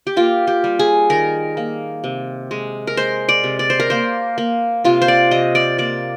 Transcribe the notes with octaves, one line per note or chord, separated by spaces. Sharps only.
G4
A#3 F4
G4
G3
G#4
D#3 A#4
A#3
C3
G#3
A#4
G#3 C5
D5
C3
D5
C5
A#4
A#3 C5
A#3
C3 F4
C5
D5
C3 D#5
D5
A#3 D5